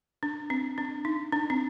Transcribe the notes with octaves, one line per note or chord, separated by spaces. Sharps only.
D4
C4
D4
D#4
D4
C4